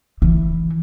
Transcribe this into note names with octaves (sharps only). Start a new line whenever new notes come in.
E3